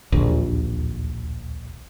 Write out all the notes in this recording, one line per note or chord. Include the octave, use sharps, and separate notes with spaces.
D1 A#1 D#2